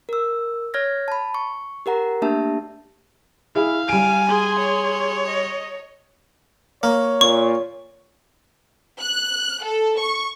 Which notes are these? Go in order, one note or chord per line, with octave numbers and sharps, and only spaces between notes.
A#4 E6
C#5 F6 G#6 A#6
A5 B5
C#6
G4 A#4 F#5 A#5
A3 A#3 D4 G4 E5 A5
E4 G#4 F5
G3 G#5 D7
G#4 C6
C#5
D#5
A#3 C#5
A#2 C#6
F#6
A4
C#6